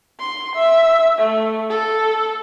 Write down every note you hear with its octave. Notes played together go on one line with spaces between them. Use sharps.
C6
E5
A3
A4